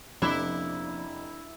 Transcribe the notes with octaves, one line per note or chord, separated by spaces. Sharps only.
F1 F3 A#3 C#4 D4 E4 D6 G7